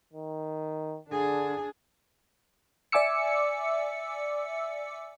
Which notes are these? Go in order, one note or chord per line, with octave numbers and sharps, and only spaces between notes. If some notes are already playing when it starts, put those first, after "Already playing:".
D#3
D3 D4 G#4
D5 E5 G#5 D6 E6 C#7